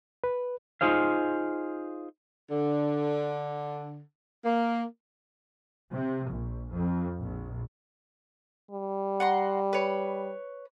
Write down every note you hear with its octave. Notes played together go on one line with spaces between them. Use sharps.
B4
D#4 F4 G#4 C5 F5
D3
A#3
C3
A#1
F2
A#1
G3
F#5 A#5 C6
B4 C#5